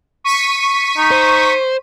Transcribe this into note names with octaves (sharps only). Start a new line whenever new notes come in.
C#6 B6 D#7
D#4
C5